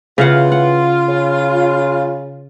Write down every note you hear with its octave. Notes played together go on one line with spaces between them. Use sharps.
C#3 E3 F4 F5 F#5
F#5
C#3